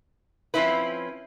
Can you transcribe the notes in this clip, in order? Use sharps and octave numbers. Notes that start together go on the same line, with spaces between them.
F3 C4 C#4 E4 B4